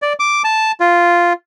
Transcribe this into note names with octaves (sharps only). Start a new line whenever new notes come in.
D5
D6
A5
F4